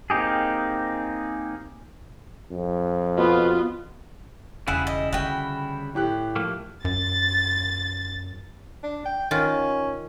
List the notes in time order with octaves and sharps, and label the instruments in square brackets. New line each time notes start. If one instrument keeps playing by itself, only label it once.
[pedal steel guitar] A#3 C4 D#4 G4 G#4
[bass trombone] F2
[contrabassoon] B2 [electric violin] B3 F4
[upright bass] E1 [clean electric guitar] C#3 G3 E4 [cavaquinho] G#4 F#5
[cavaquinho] D#5
[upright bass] D3 [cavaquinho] F#4 G5
[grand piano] A2 G4 F#6
[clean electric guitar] F3 A3 A#3
[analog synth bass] F#2 [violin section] A6
[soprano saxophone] D4
G5
[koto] D#3 F4 [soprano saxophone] C#4